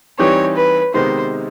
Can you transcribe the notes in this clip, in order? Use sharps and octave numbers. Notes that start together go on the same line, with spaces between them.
E3 G3 C4 D#4 G4 C#5
B4
C3 D#3 G#3 B3 D#4 C5